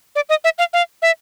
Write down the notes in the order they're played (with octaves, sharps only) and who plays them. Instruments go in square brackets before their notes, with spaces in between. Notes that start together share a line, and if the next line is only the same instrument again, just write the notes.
[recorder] D5
D#5
E5
F5
F5
E5